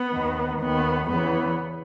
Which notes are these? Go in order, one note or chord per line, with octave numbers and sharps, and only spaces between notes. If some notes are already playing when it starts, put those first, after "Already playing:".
Already playing: B3
D#2 D#3
D#2 D#3 B3
E2 C#3 E3 B3